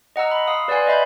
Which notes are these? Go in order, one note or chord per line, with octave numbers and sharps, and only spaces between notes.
D#5 F#5 A#5 E6
B5 C6
F5 D#6
B4 D5 F5 F#5 G#5 C6
D#5 E5 B5 G6